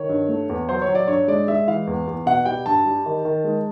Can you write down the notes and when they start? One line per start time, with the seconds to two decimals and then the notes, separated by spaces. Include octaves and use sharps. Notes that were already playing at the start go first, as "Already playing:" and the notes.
Already playing: D#3 C#5
0.09 G2
0.29 A3
0.49 E2
0.69 F#3 C5
0.82 C#5
0.88 F#3
0.95 D5
1.08 G2 C#5
1.28 G#3 D5
1.47 G#3 E5
1.67 E3 F5
1.87 E2
2.07 E2
2.26 B2 F#5
2.45 G3 G5
2.66 G2 A5
2.85 G3
3.06 D#3
3.25 D#3
3.44 G#3